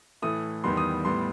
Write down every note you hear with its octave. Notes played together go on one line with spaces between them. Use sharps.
A2 E3 A3 D#6
E2 D#3 G3 B3 C6
D#6
A2 G3 B3 C6